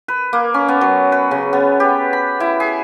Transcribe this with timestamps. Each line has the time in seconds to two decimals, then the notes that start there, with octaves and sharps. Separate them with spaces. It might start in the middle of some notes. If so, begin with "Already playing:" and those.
0.08 B4
0.33 A#3
0.54 C#4
0.68 B3
0.81 F#3
1.12 B4
1.31 C#3
1.53 B3
1.80 G4
2.13 B5
2.40 E4
2.60 G#4